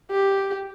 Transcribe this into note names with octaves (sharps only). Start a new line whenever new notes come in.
G4